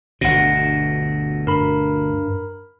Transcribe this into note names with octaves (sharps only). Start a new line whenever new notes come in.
G1 D2 B2 F#5 A#6
G2 A#4 B5